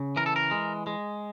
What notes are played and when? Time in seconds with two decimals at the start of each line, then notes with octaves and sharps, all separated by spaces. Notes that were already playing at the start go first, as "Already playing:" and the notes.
Already playing: C#3
0.16 E3 A#4
0.26 A4
0.36 A#4
0.51 G#3
0.87 G#3